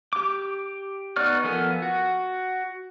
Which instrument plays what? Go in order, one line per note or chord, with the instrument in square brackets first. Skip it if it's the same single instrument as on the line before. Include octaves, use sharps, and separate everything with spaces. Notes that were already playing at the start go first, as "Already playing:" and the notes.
[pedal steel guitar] G4 D6
B3 D#4 D5 C#6 F6
F3 B3 A4 A#4 G#5
F#4